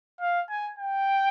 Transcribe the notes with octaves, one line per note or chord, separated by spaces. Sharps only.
F5
G#5
G5